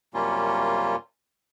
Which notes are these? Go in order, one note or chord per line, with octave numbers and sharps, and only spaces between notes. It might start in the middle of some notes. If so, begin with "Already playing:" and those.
F#2 C3 G3 A#3 C#4 F4